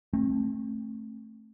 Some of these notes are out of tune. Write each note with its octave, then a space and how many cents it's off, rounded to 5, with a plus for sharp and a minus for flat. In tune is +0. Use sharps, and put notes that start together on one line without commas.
A3 +0 C4 +35